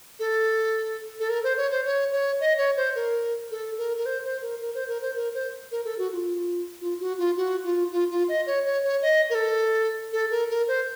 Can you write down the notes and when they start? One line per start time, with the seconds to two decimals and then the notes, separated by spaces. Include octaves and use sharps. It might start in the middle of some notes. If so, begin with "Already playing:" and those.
0.19 A4
1.20 A4
1.29 A#4
1.44 C5
1.57 C#5
1.71 C5
1.85 C#5
2.12 C#5
2.41 D#5
2.58 C#5
2.77 C5
2.95 A#4
3.51 A4
3.78 A#4
3.97 A#4
4.06 C5
4.24 C5
4.42 A#4
4.61 A#4
4.75 C5
4.88 A#4
5.02 C5
5.16 A#4
5.34 C5
5.71 A#4
5.85 A4
5.98 F#4
6.13 F4
6.81 F4
7.00 F#4
7.18 F4
7.37 F#4
7.64 F4
7.92 F4
8.11 F4
8.29 D#5
8.46 C#5
8.65 C#5
8.84 C#5
9.02 D#5
9.30 A#4
9.35 A4
10.13 A4
10.31 A#4
10.50 A#4
10.68 C5